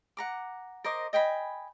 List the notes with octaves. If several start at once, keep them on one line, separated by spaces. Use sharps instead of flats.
F#5 A#5 D6
A#4 C5 D#5 D6
D#5 G5 G#5 B5